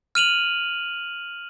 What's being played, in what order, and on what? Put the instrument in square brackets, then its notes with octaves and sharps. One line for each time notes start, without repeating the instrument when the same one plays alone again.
[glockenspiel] F6 D#7 F7 F#7